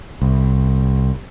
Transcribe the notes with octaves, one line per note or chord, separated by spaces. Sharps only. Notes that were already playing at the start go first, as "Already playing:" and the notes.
C2